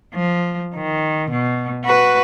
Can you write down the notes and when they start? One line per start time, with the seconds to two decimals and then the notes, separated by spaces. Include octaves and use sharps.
0.15 F3
0.75 D#3
1.30 B2
1.85 F#4 B4